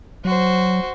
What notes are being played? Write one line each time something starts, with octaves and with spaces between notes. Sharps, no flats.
F#3 F#4 C5